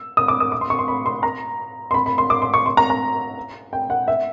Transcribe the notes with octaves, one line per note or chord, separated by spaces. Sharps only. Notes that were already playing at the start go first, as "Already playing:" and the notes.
Already playing: E6
D#6
D6
D#6
D6
C6
C#6
C6
B5
C6
A#5
C6
B5
B5
C6
D6
C6
C#6
C6
A#5
A#5
G5
F#5
E5